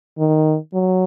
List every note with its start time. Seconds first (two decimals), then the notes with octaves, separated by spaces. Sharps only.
0.18 D#3
0.74 F#3